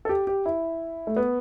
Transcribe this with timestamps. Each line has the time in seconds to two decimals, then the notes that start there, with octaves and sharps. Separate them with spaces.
0.05 A4
0.09 G4
0.27 G4
0.46 E4
1.07 A3
1.17 B3